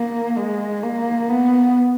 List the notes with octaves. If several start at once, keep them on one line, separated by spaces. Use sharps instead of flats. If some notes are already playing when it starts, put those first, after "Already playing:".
Already playing: A#3
G#3
A#3
B3